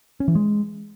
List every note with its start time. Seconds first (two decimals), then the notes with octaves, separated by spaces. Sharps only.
0.20 C#4
0.28 E3
0.35 G#3